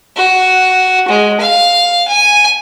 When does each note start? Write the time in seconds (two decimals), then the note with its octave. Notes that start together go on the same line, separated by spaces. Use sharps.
0.16 F#4
1.08 G#3
1.40 F5
2.08 G#5